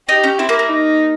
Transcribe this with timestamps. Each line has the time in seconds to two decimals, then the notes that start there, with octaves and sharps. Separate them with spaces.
0.09 D#4 G4
0.24 C#4
0.39 C4 E4
0.49 A#3
0.59 A#3
0.69 D#4